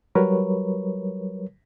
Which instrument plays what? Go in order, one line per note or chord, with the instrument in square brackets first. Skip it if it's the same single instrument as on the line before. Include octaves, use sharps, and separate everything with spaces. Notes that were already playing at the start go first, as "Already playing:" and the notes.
[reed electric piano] F#3 G3 A#4 B4 C#5